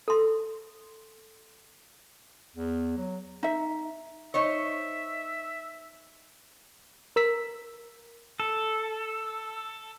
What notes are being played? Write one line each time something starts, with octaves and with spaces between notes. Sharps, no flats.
A4 C6
E2
F#3
D#4 E5
D#4 C5 C#5 E5
A#4 E6 B6
A4